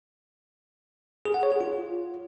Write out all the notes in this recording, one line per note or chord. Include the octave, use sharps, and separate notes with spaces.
G#4
F#5
C#5
G#4
F4